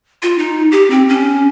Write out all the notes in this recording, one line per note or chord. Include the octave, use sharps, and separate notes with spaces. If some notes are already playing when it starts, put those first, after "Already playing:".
F4
D#4
G4
C4
C#4